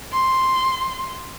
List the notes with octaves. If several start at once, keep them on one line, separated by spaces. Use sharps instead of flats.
C6